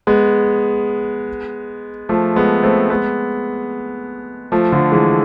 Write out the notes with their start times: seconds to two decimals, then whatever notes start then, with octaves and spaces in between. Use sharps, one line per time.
0.07 G#3 B3
2.09 F3 A3
2.36 G#3 B3
2.63 A3 C4
2.90 G#3 B3
4.52 F3 A3
4.72 D3 F3
4.92 E3 G#3